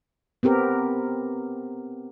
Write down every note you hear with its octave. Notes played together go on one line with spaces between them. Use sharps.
B3 C4 G4 A#4